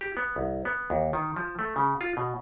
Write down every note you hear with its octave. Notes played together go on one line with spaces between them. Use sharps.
G4
B3
C2
B3
D#2
D#3
F3
A3
C#3
F4
B2